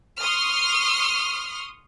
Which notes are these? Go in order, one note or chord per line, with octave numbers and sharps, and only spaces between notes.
C6 C#6 D#6 F6